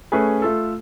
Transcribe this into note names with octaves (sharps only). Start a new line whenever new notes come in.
A3 C#4 G#4 B4
A3 F4 A4